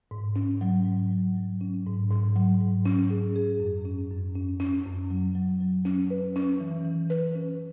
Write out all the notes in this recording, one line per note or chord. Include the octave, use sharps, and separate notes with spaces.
G#2
C#4
F#3
G#2
F#3
F#3
C#4
G#2
G#2
F#3
G#2
C#4
G#4
G#4
F#2
C#4
F#2
C#4
C#4
F#2
F#3
F#3
F#3
C#4
B4
C#4
E3
E3
B4
C#4